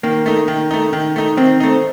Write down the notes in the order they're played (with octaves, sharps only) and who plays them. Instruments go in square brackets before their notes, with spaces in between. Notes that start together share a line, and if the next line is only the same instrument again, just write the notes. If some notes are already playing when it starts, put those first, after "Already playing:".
[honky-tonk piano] D#3 [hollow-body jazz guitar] A#3
[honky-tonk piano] A3 D#4
D#3
A3 D#4
D#3
A3 D#4
[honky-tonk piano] D#3 [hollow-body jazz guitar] C4
[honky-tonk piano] A3 D#4